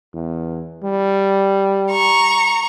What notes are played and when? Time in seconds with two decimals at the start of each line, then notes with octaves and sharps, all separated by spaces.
0.14 E2
0.83 G3
1.91 A#5 C#6